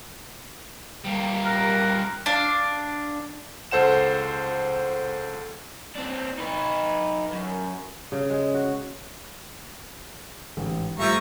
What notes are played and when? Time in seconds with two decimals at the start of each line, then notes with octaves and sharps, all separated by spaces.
1.05 G3 A#3
1.45 A#4 F#6
2.26 D4 F5
3.71 C#2 A4 C5 F#5 E7
5.96 C4 D4
6.38 D#4 B4
7.32 F#2
8.12 C#3
8.30 G#3
8.54 F#4
10.57 A1 G#2
10.99 F3 G3 A3 E5 A#5 C#6 E6